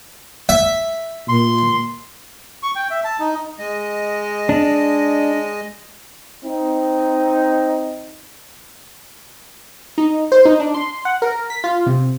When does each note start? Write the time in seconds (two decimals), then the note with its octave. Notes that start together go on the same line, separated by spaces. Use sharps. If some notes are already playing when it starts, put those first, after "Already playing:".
0.49 E5
1.29 A#2 C6
2.63 C#6
2.76 G5
2.91 E5
3.04 A5
3.19 D#4
3.59 G#3 D#5
4.49 D4
6.43 C4 D#4
9.98 D#4
10.32 C5
10.45 D#4
10.60 D4
10.74 C6
11.05 F#5
11.22 A#4
11.50 B6
11.64 F4
11.86 C3